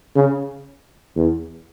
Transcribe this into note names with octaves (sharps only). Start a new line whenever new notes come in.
C#3
E2